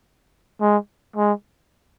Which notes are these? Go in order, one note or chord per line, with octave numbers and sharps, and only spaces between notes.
G#3
G#3